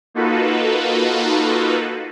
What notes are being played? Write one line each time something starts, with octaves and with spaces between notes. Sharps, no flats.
A#3 D#4 F4 F#4 A4 B4